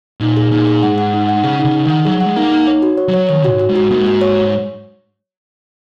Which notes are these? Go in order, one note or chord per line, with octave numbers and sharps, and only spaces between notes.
A#2 D#4
G#4
A#2 D#4
G#4
G#2 F#5
F#5
D#4
F#5
C#3 G#4
D#4
C#3
D#4
D#3 F#5
F#3 G#4
F#3 F#5
G#3
A#3 D#4
D#4
C#5
F#4
C#5
F#3
C#5
D#3 C#5
F#4
G#2
F#4
G#2
F#4
G#2 A#3
F#4
C#5